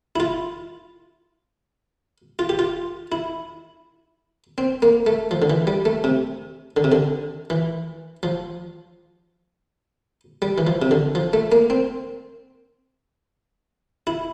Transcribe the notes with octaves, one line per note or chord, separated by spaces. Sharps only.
E4
F4
F4
G4
F4
E4
C4
A#3
A3
F3
D3
E3
G3
A3
C3
D3
C3
D3
E3
F3
G3
E3
F3
C3
D3
F3
A3
A#3
C4
E4